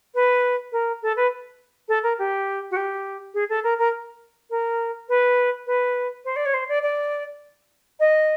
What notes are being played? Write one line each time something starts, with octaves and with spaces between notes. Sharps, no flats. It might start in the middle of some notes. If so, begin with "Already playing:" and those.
B4
A#4
A4
B4
A4
A#4
G4
F#4
G4
G#4
A4
A#4
A#4
A#4
B4
B4
C5
D5
C#5
C5
D5
D5
D#5